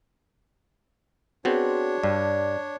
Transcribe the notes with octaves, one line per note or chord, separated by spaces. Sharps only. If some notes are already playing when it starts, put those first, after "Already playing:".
B3 C4 D4 F#4 G#4 C#5
G2 D5